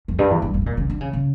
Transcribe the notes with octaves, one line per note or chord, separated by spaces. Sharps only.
F2
G2
E2
G2
G2
C#3
A#2
C#3
D3
C#3
C#3